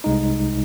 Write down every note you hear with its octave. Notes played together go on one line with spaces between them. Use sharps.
C2 C3 G#3 D#4